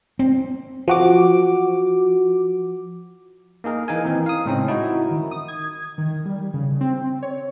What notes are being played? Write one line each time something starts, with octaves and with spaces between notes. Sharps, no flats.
C4
F3 F#4 D6
A#3 D#4 G#4 A#4
E3 D#4 A#4 F5 G#5
D#3 E3 C4 D#4
F5 D#6
A2 C#3 G#3 C4 C#4 D#4
D#4 E4 F#4
D#3
D#6
G#6
D#3
G3
C#3
C4
C#5